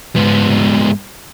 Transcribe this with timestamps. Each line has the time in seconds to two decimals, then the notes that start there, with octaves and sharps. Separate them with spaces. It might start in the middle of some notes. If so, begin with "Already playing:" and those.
0.16 G#2 B3